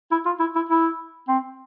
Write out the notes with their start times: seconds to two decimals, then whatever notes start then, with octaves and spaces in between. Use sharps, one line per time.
0.12 E4
0.26 F4
0.40 E4
0.56 E4
0.69 E4
1.28 C4